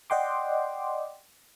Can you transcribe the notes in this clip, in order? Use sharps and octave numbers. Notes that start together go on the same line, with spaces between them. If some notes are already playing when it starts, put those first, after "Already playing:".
D5 D#5 F#5 G5 C6 D6